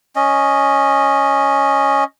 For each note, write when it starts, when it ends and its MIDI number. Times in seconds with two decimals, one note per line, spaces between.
0.16 2.04 61
0.16 2.04 75